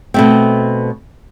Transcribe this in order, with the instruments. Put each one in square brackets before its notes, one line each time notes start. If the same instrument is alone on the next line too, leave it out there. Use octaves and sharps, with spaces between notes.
[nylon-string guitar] B2 A3 C4